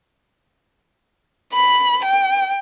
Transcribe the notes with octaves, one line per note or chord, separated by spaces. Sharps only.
B5
G5